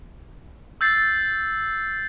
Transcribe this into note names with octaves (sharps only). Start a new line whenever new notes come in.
E6 G6 A6 C7